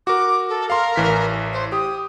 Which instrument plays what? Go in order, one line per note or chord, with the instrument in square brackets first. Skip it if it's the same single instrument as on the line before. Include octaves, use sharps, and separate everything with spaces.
[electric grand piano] F#4 A#4 [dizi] D6
[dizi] A4
[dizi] A#4 [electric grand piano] F5 C6
[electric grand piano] A1 E3 B6
[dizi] C5
[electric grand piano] G4 [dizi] D#6